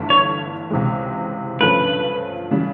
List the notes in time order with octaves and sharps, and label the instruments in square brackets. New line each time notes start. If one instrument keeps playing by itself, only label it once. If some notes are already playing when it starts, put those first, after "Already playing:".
Already playing: [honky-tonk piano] G1 G2 E3 A3 D4
[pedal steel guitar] C#5
[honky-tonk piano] C#2 C3 E3 G#3
[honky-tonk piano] G2 D3 F3 A3 C#4 [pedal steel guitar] B4
[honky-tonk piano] C#3 E3 G3